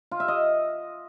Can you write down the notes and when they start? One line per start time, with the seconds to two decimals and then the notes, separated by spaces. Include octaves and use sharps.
0.11 F4
0.20 E5
0.28 D#5